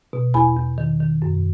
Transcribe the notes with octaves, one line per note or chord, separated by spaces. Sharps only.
B2
E2 G#5 B5
E2
D#3
D#3
F#2